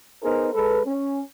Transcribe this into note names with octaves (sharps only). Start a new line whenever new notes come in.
B3 D#4 G#4 A#4 C5
G#3 A4 B4
C#4